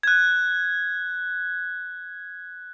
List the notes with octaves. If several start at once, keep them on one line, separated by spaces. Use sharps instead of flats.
F#6 G#6